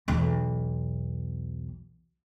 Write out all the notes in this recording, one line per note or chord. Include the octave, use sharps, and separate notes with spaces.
B1 E2